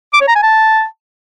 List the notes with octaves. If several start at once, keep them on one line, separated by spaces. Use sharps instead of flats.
D6
C#5
A#5
G#5
A5